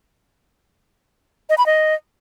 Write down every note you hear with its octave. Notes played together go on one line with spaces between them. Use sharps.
D#5
B5
D#5